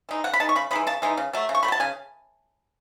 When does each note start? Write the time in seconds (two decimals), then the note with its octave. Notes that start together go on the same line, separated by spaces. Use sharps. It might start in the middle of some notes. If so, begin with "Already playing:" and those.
0.09 E3 G#3 D#4
0.24 C#3 F#5
0.33 B5
0.40 E3 G#3 D#4 A5
0.49 C#6
0.55 C#3 B5
0.71 E3 G#3 D#4 B5
0.87 C#3 A5
1.02 E3 G#3 D#4
1.17 C#3
1.33 F#3 A3
1.49 C#3
1.55 C#6
1.63 A3 B5
1.68 F#3 A5
1.80 C#3 G#5